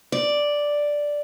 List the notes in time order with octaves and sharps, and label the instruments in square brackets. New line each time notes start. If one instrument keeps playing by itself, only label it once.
[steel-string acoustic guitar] D5